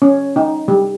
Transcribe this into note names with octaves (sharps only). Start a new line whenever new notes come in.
C#4
D#4
G3